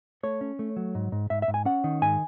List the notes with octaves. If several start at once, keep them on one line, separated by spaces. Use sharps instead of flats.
A3 C#5
C#4
A3
F#3
G#2
G#2
G#2 E5
E5
G#2
G#5
C#4 F#5
D#3
G#2 G#5